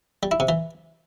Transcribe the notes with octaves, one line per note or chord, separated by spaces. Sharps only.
G3
E4
C3
E3